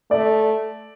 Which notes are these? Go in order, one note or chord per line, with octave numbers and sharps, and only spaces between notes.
A3 D5